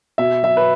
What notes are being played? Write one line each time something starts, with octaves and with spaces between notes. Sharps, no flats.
B2 E5
F#3 E5
B4